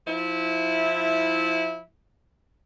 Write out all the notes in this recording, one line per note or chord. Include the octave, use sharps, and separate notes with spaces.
F3 E4